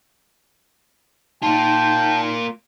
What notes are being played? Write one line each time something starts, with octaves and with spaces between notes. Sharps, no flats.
A#3 D#4 F4 G5 A5